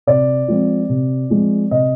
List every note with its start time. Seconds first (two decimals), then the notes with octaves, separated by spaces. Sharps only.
0.07 C3 D5
0.48 F3 G#3 C4
0.89 C3
1.30 F3 G#3 C4
1.71 C3 D#5